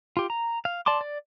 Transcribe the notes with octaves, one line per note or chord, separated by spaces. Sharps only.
F4 G4
A#5
F5
D5 A5 C6 D6
D5